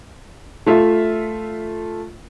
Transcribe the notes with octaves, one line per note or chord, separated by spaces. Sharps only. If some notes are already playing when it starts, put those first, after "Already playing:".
A3 F4 E5